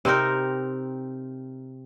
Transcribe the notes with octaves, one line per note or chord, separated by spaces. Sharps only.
C3 C4 D#4 A#4